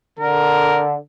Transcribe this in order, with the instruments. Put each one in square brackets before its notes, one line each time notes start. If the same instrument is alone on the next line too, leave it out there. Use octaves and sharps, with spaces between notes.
[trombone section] D3 [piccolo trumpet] A#4